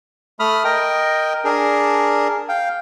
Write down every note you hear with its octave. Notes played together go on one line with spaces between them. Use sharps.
A3 B5 D#6 F6
A#4 D#5 G5
D4 G#4 A#4
F5 G5